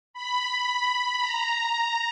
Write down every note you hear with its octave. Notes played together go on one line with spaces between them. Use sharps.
B5
A#5